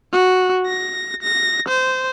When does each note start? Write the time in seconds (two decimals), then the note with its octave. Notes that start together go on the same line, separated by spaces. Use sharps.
0.13 F#4
0.66 A#6
1.22 A#6
1.68 C5